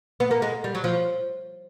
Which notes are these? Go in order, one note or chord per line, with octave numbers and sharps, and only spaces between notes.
B3
A#3
G#3
G3
F#3
F3